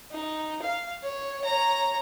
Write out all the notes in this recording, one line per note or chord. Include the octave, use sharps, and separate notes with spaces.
D#4
F5
C#5
C#5 A#5